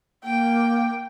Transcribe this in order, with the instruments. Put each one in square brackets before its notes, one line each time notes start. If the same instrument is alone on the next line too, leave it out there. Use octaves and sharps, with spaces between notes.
[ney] A#3 [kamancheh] G5